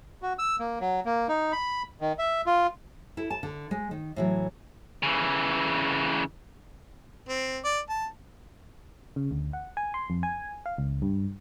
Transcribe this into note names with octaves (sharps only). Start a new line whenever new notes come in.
F#4
E6
A#3
F#3
A#3
D#4
B5
D#3
E5
F4
E4 A4
A5
D3
G#3
D#3
A2 E3 F#3
C#3 E3
C4
D5
A5
C#3
D2
F#5
G#5
C6
F2
G#5
F5
C#2
G2